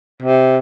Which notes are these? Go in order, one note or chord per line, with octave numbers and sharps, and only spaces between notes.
C3